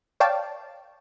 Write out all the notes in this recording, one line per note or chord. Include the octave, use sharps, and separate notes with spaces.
C#5 D5 F5 G5 A5